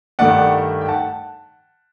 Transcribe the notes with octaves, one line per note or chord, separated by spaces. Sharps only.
G2 D#3 A3 D5 F#5
G5
F#5 A5